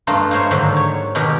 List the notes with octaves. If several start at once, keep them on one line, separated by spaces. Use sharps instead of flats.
G2 A3 A#3 D#4 F4
D#4 A#4 C5 C#5
G#2 D3 D#3 F#3
C#5
B2 D#3 D#4 G4 A#4